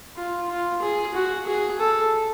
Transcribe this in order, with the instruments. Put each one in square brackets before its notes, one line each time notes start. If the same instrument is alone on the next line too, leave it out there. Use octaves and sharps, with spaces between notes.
[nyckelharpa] F4
F4
G#4
F#4
G#4
A4